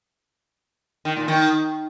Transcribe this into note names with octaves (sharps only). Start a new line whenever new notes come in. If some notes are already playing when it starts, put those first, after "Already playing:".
D#3
A#2
D#3